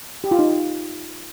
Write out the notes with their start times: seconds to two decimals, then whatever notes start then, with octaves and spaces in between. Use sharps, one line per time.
0.24 G4
0.31 F4
0.39 D#4